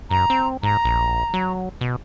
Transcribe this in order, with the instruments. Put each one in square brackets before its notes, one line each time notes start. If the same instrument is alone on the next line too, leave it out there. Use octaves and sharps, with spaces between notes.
[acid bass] F#2 [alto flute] A#5
[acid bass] C4
[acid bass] G#2 [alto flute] A#5
[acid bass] A#1
F#3
B2